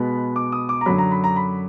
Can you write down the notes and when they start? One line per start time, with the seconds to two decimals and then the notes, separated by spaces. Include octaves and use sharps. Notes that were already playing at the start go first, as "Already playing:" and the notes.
Already playing: B2 G#3 B3 B5
0.36 D6
0.52 D#6
0.69 D6
0.81 A#5
0.86 F#2 D3 F#3 B5
0.98 A#5
1.11 B5
1.24 A#5
1.36 B5